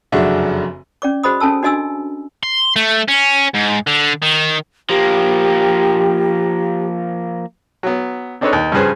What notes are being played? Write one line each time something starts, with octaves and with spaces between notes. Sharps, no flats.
F1 F#2 C#3 D4 F#4 E5
C#4 D5 D6
F#4 G#4 C5 D#5 B5 D#6
C#4 A4 G#5 A5 E6
D4 F#4 D#5 G#5 E6
C6
A3
C#4
G#2
D3
D#3
F3 A#3 G4
F#3 B3
C4 D4 D#4 A4 B4 C#5
D#2
G2 C#3 F3 G#4 B4 C5